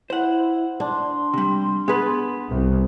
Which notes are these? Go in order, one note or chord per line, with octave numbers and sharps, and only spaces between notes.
E4 C5 F#5
D4 C6
C3 G3
B3 G#4 B4
C2